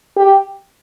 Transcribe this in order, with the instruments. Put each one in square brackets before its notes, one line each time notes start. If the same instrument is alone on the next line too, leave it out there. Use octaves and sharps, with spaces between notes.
[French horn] G4